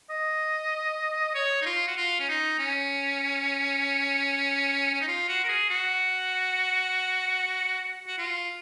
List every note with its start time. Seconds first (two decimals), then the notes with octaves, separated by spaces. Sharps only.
0.10 D#5
1.34 C#5
1.61 D#4
1.66 F4
1.87 F#4
1.97 F4
2.20 C#4
2.28 D#4
2.59 C#4
4.94 C#4
5.01 D#4
5.08 F4
5.28 F#4
5.44 A#4
5.49 G#4
5.70 F#4
8.07 F#4
8.18 F4